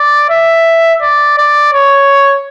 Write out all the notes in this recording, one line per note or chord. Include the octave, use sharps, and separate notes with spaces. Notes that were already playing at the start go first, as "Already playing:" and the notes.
Already playing: D5
E5
D5
D5
C#5